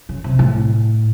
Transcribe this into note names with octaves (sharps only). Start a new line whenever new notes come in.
C#3
C3
A2